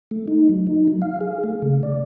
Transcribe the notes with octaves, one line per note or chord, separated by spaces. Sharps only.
A3
D#4
F#3
D#4
F#3
F5
G#4
A3
C#3
D5